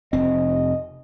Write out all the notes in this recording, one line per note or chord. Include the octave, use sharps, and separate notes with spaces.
F1 C4 D#5